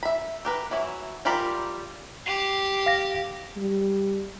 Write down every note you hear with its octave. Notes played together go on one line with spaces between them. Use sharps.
E5 B5
G4 A#4 B4
E3 F#3 E4
G3 F4 G4 A#4 B5
G4 C7
F5 A#6
G3